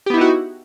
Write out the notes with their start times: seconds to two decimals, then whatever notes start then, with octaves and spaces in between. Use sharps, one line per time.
0.06 G4
0.10 B3
0.14 E4
0.17 D#4
0.21 F#4